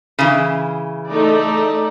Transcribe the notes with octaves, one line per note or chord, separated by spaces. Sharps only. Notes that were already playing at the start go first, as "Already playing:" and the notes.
C#3 E3
A3 D#4 D5